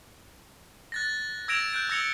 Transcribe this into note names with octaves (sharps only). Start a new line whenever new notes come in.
F#6 A6 A#6
E6 G#6 A#6 D7 E7 F7
F#6 G6 D7
E6 G#6 A#6 C#7 F7 G7